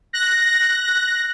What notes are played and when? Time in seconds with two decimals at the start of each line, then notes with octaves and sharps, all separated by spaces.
0.13 F#6 A#6